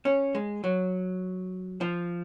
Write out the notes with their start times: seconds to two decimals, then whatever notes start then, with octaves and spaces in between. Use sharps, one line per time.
0.05 C#4
0.35 G#3
0.64 F#3
1.81 F3